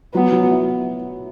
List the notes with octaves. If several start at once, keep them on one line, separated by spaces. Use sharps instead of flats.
F#3 B3
F#3
E4